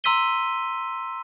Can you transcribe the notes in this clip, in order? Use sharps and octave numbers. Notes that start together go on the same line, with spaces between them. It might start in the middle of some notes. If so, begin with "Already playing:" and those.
A#5 C6 E6 B6 D#7 G7